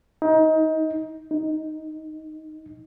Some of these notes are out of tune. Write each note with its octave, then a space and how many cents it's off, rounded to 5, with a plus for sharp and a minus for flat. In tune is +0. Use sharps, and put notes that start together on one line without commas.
D#4 +25
D#4 +5